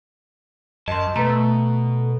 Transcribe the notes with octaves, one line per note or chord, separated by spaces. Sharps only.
F#2 D#5 A5 C6
B2 A3 B4 A#5